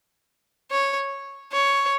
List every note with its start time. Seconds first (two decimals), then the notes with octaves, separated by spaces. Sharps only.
0.71 C#5
1.52 C#5